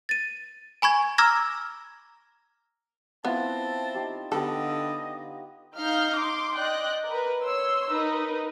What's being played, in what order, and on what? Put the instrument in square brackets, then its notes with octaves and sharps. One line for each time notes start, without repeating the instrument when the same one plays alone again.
[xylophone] A6 D#7
G#5 B5 C#6 G#6
A#5 D6 E6 F6 G#6 A#6
[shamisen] B3 [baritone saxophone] C4 [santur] E4 F4 [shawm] A5
[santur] D#4 G4
[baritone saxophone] D3 [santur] B3 D#4 G4 [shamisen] A4 [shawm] D#5
[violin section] D#4 F5 F6 G6 C7
C6 D6
D5 D#5 G5 F#6
A#4 B4
C#5 C6 E6
D#4 A#4 B4